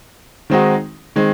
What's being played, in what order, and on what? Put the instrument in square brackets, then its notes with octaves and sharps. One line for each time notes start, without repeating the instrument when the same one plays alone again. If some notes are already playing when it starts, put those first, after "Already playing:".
[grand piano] D#3 G#3 C4 D#4 F#4
D#3 G#3 C4